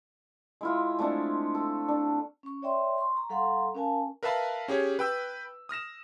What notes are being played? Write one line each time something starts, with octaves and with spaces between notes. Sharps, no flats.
G#3 E4 F4
G#3 A3 C4 D4
A4
D4
C#4 C#6
C#5 D5 E5 G5 C6
C6 C#6
A#5
G3 A4 F5 F#5 A#5 C6
C#4 A#4 F5 G#5 A5
A#4 B4 E5 F5 A5 B5
C#4 G4 G#4 C#5
B4 G5 E6
D#6 F6 A#6 E7